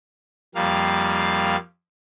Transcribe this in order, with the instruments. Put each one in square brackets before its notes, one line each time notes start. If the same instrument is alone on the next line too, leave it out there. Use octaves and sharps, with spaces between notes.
[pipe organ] F2 G3 A#3 F5